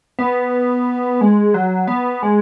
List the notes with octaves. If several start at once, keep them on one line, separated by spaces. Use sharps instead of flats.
B3
G#3
F#3
B3
G#3